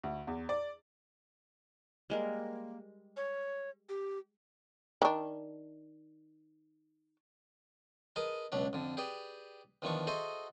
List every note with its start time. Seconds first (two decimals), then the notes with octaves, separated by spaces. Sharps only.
0.03 D2
0.27 E2
0.49 D5
2.10 G3 G#3 A#3 A#4
3.17 C#5
3.89 G4
5.02 D#3 D4
8.16 G#4 A#4 B4 D#5 A5
8.52 C#2 B2 F#3 D4 D5
8.73 F2 D3
8.97 G4 G#4 B4 D5 G5
9.82 E2 D#3 F3 B3 D4 C#6
10.07 F#4 G#4 A4 C5 D#5 E5